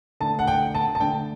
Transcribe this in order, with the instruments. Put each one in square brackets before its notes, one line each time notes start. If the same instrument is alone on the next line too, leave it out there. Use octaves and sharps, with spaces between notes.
[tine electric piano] D3 A3 D4 [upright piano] A5
[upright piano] F#5
G5
A5
A5
[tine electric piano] D3 A3 D4 [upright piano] G5